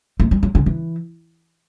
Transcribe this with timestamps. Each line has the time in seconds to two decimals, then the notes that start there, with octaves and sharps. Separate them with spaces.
0.20 A3
0.31 G3
0.43 F#3
0.55 D3
0.66 E3